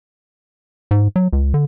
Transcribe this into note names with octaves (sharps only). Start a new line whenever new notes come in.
G#2
F#3
C#2
D3